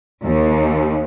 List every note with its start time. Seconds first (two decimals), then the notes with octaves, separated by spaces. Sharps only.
0.23 D#2